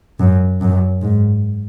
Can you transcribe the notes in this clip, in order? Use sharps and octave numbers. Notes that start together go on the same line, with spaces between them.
F#2
F#2
G#2